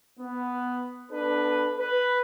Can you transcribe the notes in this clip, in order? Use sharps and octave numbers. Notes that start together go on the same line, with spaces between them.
B3
B3 D4 A4 B4
B4